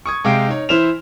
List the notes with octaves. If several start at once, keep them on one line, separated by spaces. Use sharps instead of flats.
C#6 D#6 G#6
C3 G#3 F5 G5 D7
D#4 C#5
E3 E4 C5 F6 E7 F7